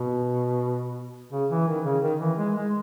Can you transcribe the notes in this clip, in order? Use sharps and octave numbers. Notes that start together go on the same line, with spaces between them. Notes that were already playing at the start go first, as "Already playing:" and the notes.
Already playing: B2
C#3
E3
D#3
C#3
D#3
E3
G#3
G#3